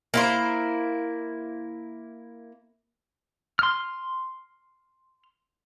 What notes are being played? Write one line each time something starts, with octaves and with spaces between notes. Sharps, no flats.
A#3 E4 C5
C6 F6